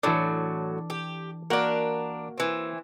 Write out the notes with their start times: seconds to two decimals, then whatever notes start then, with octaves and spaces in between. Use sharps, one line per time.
0.03 A2 E3 F#3 D4 A4 A5 D6
0.90 G4
1.50 A#3 D4 F#4 A#4 F#5
2.38 E3 C4